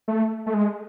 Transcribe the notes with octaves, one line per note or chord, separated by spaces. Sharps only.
A3
A3
G#3